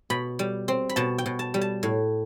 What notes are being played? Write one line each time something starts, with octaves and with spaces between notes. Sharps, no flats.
B2 B5
G3
C4
B5
B2 A5
G5
B2
A5
G3
A5
A2